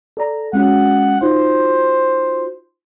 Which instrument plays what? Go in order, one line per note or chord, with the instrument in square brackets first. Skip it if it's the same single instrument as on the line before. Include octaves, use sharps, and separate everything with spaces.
[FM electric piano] A4 D5 A#5
[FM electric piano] G#3 C#4 F#4 [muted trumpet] F#5
[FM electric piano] D#4 F4 F#4 [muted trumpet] C5